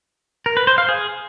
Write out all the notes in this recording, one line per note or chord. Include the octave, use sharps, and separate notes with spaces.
A#4
B4
C5
F5
G#4